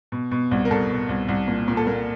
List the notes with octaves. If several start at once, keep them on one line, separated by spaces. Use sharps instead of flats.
B2
B2
C2
A#4
C2 A4
B2
C2
C2
A#2
A#2
A4
A#2 A#4